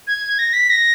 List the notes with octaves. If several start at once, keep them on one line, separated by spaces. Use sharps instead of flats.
G#6
A#6
B6
A#6